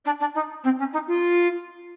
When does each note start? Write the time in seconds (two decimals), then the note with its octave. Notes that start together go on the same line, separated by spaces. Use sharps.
0.05 D4
0.20 D4
0.34 D#4
0.64 C4
0.78 C#4
0.93 D#4
1.07 F4